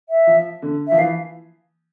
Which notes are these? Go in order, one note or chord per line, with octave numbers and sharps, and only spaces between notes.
E5
F3
D3
F3 E5
E3 F5